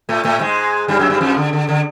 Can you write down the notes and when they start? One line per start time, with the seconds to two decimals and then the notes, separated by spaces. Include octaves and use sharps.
0.09 A2 A3
0.25 A2 A3
0.41 G#2 G#3
0.88 G2 G3
0.99 F#2 F#3
1.10 G2 G3
1.21 F2 F3
1.37 D3
1.53 D3
1.69 D3